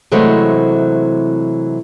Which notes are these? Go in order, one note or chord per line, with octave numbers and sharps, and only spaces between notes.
C3 E3 F#3 G#3 A3 C4